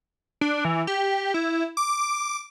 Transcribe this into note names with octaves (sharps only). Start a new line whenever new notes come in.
D4
E3
G4
E4
D6